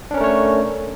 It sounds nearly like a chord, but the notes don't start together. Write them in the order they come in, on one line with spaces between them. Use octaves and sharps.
D4 C#4 A#4 A3 C#5